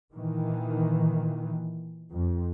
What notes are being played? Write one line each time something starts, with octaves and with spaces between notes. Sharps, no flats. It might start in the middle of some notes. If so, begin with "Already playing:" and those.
A#2 D#3 E3
F2